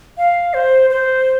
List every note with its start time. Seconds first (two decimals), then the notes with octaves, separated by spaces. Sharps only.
0.18 F5
0.54 C5
0.90 C5